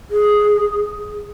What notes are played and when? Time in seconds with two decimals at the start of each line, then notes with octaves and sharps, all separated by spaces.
0.11 G#4